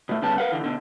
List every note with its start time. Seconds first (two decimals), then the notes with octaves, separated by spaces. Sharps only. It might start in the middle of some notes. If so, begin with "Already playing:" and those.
0.09 B2 A3
0.22 D2 C#3 G3 B3 A5
0.38 A#4 B4 F5 F#5
0.52 E2 D3 E3
0.64 B2 D3